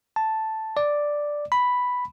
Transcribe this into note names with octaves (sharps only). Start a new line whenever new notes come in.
A5
D5
B5